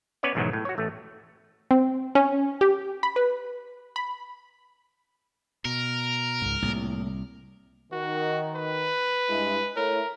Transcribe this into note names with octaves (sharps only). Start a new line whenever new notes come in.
B3 C#4 B4 C#5 D5
B1 E2 G#2 B2 D#3 F#3
A2
F#4 C#5
A1 A3
C4
C#4
G4
B5
B4
B5
B2 A#4
C#2 G#2
C2 A2 A#3
D#3 F#4
B4
G2 G#3 E4
A3 E4 A#4 C#5